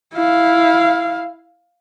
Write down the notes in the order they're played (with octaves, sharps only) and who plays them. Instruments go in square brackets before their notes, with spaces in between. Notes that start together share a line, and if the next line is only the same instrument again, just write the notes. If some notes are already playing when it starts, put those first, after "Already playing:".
[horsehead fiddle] E4 F5